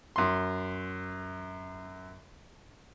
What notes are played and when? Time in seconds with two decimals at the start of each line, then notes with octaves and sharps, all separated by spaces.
0.16 F#2 C6